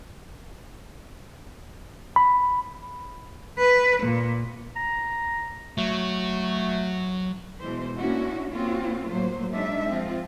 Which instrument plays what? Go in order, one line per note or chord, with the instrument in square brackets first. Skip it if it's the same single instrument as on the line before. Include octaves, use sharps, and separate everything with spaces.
[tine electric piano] B5
[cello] B4
A#2
[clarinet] A#5
[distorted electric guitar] F#3 [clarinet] A3
[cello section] B2 E3 G#3 C5
A#3 C#4 D4 E4 F#4
A#3 C4 C#4 F4 F#4
A2 F#3 A#3 C5
F#3 G#3 D4 D#4 E5
F3 C4 F4